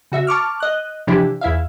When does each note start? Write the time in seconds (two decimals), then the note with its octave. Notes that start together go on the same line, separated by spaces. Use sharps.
0.12 C#3 F#4 E5
0.27 A5 C#6 D6 F6
0.60 D#5 F#6
1.07 C3 E3 F3 D4 E4 G4
1.41 E2 E4 E5 F5